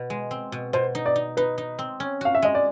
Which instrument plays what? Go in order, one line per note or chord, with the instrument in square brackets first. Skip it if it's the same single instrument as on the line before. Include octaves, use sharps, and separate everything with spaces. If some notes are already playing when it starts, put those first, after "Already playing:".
Already playing: [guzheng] B2
G#3
C4
B2
[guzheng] B2 [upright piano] C5
[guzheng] D#4
[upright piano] D5
[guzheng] D#4
[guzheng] D#4 [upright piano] B4
[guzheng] D#4
C4
C#4
[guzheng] F#4 [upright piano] F5
[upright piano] E5
[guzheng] G#3 [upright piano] D#5
[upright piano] D5